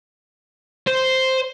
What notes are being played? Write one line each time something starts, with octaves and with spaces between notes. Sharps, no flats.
C5